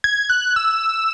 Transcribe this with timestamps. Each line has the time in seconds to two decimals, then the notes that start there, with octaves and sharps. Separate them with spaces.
0.04 G#6
0.30 F#6
0.56 E6